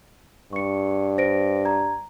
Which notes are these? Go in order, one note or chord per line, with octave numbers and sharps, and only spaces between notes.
G2 C#6 C#7
C5 A#6 D7
A#5 G#6